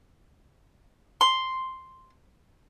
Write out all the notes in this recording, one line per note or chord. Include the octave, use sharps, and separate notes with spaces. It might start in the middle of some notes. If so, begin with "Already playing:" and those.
C6